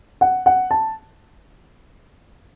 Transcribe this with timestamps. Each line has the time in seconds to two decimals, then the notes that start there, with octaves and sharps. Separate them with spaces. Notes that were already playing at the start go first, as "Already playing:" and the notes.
0.21 F#5
0.46 F#5
0.71 A5